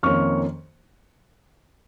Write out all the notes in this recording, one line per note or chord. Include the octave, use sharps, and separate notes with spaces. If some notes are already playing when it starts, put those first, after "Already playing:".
F2 D#3 A#3 C#4 C#6 F6